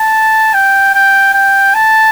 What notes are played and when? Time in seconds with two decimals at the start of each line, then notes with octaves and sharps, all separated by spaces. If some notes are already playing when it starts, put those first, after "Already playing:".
Already playing: A5
0.54 G5
0.95 G5
1.34 G5
1.74 A5